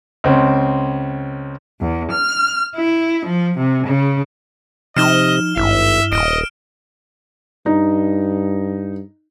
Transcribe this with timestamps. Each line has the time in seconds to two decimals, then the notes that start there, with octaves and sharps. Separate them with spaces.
0.24 C#2 C4 C#4
1.81 E2
2.11 F6
2.76 E4
3.26 F3
3.58 C3
3.87 C#3
4.96 C3 F3 D#4 D#5 F6 E7 G7
5.57 G#1 G2 E4 E5
6.12 D#1 D#5 F6 D7
7.66 G2 D#4